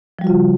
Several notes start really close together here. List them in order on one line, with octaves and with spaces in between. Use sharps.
F3 G3 F#4 F4 C#3